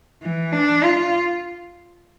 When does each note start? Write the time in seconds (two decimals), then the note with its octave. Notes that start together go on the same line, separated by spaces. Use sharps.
0.22 E3
0.53 D4
0.84 F4